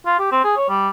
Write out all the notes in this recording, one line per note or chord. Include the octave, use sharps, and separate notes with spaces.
F4
G4
C4
G#4
C#5
G3